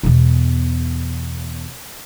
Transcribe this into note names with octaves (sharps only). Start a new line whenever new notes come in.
E2 B2